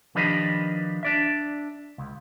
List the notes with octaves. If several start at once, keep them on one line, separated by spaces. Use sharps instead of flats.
D#3 F3 D4 G4 B4 D#5
D4 D5 E5
C#2